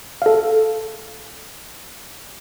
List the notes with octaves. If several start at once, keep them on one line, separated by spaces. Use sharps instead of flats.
A4 F5